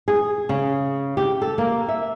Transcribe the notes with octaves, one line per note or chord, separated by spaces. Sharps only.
G#4
C#3
G4
A4
A#3
E5